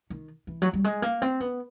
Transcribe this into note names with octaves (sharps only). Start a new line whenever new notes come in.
D#3
E3
F#3
G3
G#3
A#3
C4
B3